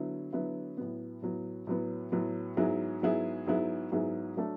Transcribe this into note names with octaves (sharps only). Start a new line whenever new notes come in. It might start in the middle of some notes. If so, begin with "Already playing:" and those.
Already playing: D3 F#3 B3 E4
D3 F#3 B3 E4
A2 F#3 B3
A2 F#3 B3
A2 F#3 B3
A2 F#3 B3
G#2 F#3 B3 E4 G#4
G#2 F#3 B3 E4 G#4
G#2 F#3 B3 E4 G#4
G#2 F#3 B3 E4 G#4
F#3 A3 D4 A4